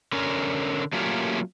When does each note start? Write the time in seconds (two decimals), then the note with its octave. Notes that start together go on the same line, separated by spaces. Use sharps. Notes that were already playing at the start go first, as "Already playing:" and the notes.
0.12 D3 C#4 A#4
0.93 F#3 A3 A#3 C#4 F4 G4